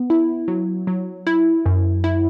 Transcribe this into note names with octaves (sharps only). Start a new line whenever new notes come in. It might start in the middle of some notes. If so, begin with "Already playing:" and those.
Already playing: B3
E4
F#3
F#3
E4
F#2
E4